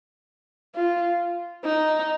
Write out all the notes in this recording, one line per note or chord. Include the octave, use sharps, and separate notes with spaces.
F4
D#4